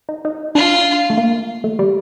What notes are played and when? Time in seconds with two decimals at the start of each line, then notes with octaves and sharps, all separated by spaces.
0.09 D#4
0.25 D#4
0.55 D4 F4
1.10 A3
1.17 A#3
1.64 A3
1.79 G3